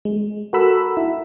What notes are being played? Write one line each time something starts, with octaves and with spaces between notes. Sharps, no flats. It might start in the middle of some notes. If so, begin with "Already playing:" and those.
G#3
F#4 A4 A#4 F#5 B5 E6
E4